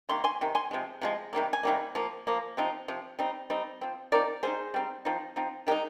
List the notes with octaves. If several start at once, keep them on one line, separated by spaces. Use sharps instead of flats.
C3 D#3 A#3 C6
G#5 C6
C3 D#3
G#5 C6
C3 F3 G#3
C3 F3 G#3
C3 D#3 G3 A#3
G#5
C3 D#3 G3 A#3
F3 A#3
F3 A#3
C3 F3 C4 D#4
C3 F3
G3 C4 D#4
G3 C4 D#4
F3 C4
F3 C4 D#4 A#4 D5
G3 C4 D#4 G#4 C5
G3 C4 D#4
F3 C4 D#4
F3 C4 D#4
D#3 G#3 D#4 G4 A#4